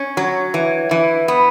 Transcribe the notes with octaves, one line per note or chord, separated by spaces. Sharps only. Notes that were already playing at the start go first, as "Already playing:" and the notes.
Already playing: C#4
F#3
E3
E3
B3